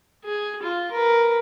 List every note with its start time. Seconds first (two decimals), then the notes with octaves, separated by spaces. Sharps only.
0.24 G#4
0.62 F4
0.91 A#4 B4